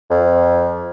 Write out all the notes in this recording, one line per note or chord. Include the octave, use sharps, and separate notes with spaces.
F2